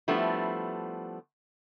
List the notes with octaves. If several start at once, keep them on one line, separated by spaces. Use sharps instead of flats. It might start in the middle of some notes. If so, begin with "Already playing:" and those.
F3 G3 A3 B3 D4 E4